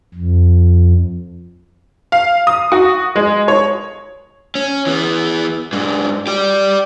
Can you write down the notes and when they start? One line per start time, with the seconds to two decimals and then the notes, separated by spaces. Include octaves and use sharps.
0.14 F2
2.12 F5
2.47 D#6
2.72 F#4
3.16 G#3
3.48 C#5
4.55 C#4
4.86 E3 B3
5.73 G#2 D4
6.27 G4 D5